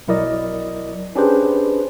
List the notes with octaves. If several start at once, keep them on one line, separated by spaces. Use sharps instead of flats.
B1 F#3 E4 A#4 D5 D#5
C#4 D4 G4 G#4 B4 C5